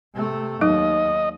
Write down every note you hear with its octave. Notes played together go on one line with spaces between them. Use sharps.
C3 A3
D#2 F#3 D#4 D#5